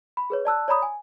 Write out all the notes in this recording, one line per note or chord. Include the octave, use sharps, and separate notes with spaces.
B5
G#4 B4 C#5
D5 A5 E6 F#6
C#5 D5 A#5 B5 D#6
G#5